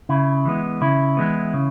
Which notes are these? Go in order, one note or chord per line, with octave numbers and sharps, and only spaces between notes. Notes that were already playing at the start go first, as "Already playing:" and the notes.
C#3 E4
E3 G#3 B3
C#3 E4
E3 G#3 B3
C#3